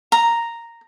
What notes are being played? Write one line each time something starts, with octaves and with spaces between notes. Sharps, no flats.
A#5